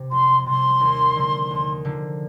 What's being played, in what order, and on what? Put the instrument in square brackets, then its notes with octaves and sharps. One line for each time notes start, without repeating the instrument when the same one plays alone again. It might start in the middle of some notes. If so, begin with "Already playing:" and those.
Already playing: [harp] C3
[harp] F2 [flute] C6
[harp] C3 G3 [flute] C6
[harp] D#2
D3 F3 A#3
D#2
D3 F3 A#3